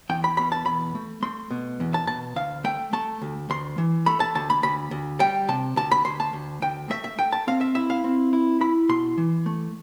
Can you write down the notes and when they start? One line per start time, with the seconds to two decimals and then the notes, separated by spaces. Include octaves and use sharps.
0.10 E2 G5
0.24 B5
0.37 B2 B5
0.52 A5
0.66 E2 B5
0.95 A3
1.22 A3 C6
1.51 B2
1.80 E2
1.94 A5
2.07 B2 A5
2.36 D2 F5
2.64 A3 G5
2.93 A3 A5
3.22 D2
3.50 D2 C6
3.78 E3
4.06 A3 B5
4.20 A5
4.35 D2 A5
4.50 B5
4.63 D2 B5
4.91 D2
5.20 G3 G5
5.48 C3 A5
5.76 D2 A5
5.91 B5
6.05 D2 C6
6.20 A5
6.33 D2
6.62 D2 G5
6.90 A3 E5
7.04 E5
7.19 A3 G5
7.32 A5
7.47 C4 F5
7.61 E5
7.75 E4 E5
7.90 F5
8.04 C4
8.33 E4
8.61 E4 B5
8.89 B2 C6
9.18 E3
9.46 A3